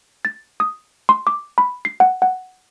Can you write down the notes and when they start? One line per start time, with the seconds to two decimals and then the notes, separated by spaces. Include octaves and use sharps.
0.25 A6
0.60 D#6
1.09 C6
1.27 D6
1.58 B5
1.85 C7
2.00 F#5
2.22 F#5